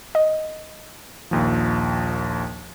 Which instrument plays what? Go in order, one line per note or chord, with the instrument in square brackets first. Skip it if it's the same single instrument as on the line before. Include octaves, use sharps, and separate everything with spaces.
[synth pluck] D#5
[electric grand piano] A#1 D#2 F3